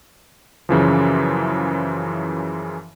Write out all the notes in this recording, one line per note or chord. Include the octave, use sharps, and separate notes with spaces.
F#2 C#3 E3 F3